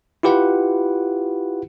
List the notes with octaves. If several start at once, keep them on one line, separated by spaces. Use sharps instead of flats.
E4 F4 G4 B4 F#5